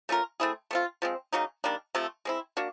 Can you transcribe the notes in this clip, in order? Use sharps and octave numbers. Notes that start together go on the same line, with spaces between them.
A3 C#4 F4 A#4
A3 C4 E4 G#4
A3 C4 F4
F3 G#3 C4
C#3 F#3 A#3 D#4
D#3 G3 A#3 D4
C3 F3 A3 C4
G#3 C4 E4
A#3 D4 F#4